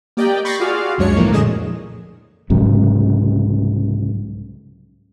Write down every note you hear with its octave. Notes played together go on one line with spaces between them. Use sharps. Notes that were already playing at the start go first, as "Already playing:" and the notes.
A#3 G4 D5 D#5 G5
B5 C#6 G6 A6 A#6 C7
F4 F#4 G#4 D5 F5
C#2 F#2 G#3 D4 C#5 C#7
A2 E3 F3 A#3
F2 A#2 D3 G#4 D#5 E7
C2 G#2 C#3 F#3